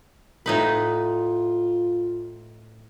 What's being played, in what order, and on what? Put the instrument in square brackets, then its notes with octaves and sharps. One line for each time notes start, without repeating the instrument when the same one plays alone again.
[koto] A2 D#4 B4 [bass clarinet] F4